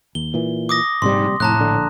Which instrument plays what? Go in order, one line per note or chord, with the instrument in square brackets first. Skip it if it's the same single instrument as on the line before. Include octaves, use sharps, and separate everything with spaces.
[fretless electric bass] D#2 [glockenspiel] G7
[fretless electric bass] A#2 E3
[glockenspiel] D6 D#6 A#6
[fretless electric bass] A#1 C3 G3 [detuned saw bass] G#2 [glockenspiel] C6
[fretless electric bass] F1 [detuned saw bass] A2 [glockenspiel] A5 A#5 F#6
[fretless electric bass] A#1 D3